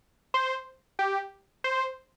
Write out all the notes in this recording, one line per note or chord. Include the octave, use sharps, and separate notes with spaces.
C5
G4
C5